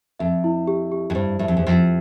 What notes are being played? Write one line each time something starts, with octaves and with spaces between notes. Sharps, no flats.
F2 E5
E4
G4
G4
F2
G2 C5
G2 E5
F2
E2
F2 C5